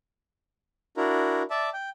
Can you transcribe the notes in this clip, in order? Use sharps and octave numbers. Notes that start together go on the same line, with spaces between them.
D4 E4 F#4 A#4
D5 E5 A5
G5